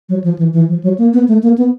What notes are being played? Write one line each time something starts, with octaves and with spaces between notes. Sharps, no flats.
F#3
F3
E3
E3
F3
F#3
A#3
B3
A3
A#3
B3